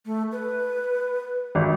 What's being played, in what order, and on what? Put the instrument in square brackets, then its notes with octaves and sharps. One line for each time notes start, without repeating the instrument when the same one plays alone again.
[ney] A3
B4
[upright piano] G#1